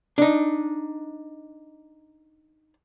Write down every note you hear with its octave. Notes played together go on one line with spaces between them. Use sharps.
D4 D#4